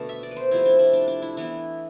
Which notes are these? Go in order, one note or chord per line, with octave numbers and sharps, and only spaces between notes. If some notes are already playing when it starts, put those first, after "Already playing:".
Already playing: B2 D3 A3 D4 A5
E5
D5
B4
C5
C3 F3 A3 E4
D4
E4
D4
D4
E4
E3 B3 D4 E4